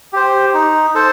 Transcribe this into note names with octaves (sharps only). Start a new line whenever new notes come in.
G4 C5
D#4
A4 C5